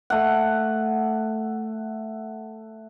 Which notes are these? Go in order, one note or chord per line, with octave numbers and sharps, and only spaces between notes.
A3 F#5